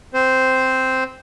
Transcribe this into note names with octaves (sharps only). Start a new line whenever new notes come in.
C4 C5